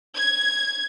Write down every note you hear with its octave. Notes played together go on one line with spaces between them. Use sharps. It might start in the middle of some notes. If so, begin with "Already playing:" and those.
G#6